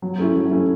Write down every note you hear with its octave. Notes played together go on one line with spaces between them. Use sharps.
F#3
A3 C#4 E4
F#3
A3 C#4 E4